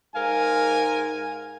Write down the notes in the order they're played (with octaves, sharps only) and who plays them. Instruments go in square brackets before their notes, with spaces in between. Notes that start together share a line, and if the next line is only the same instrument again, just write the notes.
[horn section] G#2 A#4 F5 G#5